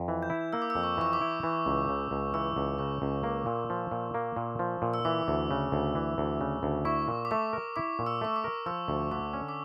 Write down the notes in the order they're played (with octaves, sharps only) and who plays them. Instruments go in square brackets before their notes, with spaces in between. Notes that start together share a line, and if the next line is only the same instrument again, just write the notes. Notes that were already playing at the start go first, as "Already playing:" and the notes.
Already playing: [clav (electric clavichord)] F2
E3
[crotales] G6
[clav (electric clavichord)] E4
[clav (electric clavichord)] A#3 [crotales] E6
[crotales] D6
E6
[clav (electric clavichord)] F2
[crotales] C#6
[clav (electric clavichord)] E3 [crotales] C#6
[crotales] D6
[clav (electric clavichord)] E4
E3
C#2
C#3
C#2
[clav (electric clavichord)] E3 [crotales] E6
[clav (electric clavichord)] C#2
[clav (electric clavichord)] C#3 [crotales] C#6
[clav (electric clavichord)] C#2
A#3
A#2
F3
A#2
A#3
A#2
F3
A#2
[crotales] E6
[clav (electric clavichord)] E3 [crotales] D6
[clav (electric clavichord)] D2
C#3
D2
E3
D2
C#3
D2
[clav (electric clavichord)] E4 [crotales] C#6
[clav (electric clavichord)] A#2
[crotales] D6
[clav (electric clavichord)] A3 [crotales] C#6
[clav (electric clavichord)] A#4
[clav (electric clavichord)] E4 [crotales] D6
[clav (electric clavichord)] A#2
[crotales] E6
[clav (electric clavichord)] A3 [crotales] C#6
[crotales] D6
[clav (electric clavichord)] A#4
[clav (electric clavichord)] F3 [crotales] E6
[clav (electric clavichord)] D2
[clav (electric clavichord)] D3 [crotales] D6
[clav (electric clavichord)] C#4
[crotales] D6